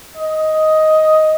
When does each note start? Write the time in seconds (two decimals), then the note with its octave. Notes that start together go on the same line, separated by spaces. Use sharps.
0.17 D#5